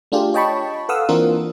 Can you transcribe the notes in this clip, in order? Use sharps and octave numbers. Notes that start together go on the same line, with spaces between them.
A3 D4 F4 G4 G#4
C#5 D#5 G5 A5 B5 C#6
A4 B4 F5 F#5 D#6 E6
E3 A#3 C4 D4 F4 A#4